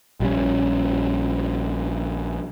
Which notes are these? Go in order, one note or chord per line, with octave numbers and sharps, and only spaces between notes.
A#1 G3 C#4